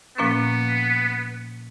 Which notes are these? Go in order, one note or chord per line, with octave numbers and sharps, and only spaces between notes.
A#2 F3 A#3 B3 C#4